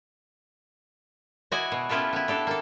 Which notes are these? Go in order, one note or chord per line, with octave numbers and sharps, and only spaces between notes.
E4 F#4 D5 D#5 G#5
B2
B3 C#4 E4 F4 G4 A4
B3 E4
D4 G4 A4
A#3 A4